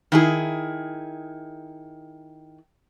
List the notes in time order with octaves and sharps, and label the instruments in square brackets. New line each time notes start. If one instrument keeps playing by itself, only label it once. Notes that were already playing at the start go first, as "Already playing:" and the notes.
[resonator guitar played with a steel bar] D#3 E4 G#4